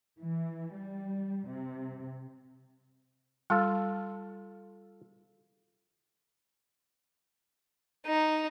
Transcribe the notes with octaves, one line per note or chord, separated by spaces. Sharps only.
E3
G3
C3
G3 F4 A4
D#4